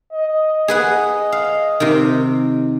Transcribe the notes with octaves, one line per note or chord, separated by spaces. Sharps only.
D#5
G#4 B4 F#5
F5
C3 D#3